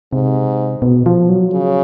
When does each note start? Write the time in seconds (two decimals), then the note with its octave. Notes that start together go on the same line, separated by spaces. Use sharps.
0.12 G#2 C3
0.82 B2
1.06 F3
1.29 F#3
1.53 C#3